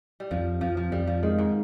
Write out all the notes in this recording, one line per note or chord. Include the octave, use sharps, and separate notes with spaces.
G3
F2 F3
F2 F3
F3
F2 G3
F3
D#3 G#3
G#2